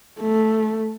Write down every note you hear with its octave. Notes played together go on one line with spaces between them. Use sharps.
A3